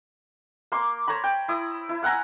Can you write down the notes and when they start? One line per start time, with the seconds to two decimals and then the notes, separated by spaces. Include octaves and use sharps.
0.72 A#3 C6 D6
1.08 C5 C#5 A#5 B5
1.24 G5
1.48 E4 D#6
1.89 E4
2.03 F5 F#5 G#5 A#5